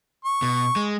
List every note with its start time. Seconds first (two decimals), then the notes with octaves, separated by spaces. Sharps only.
0.25 C#6
0.42 B2
0.76 G#3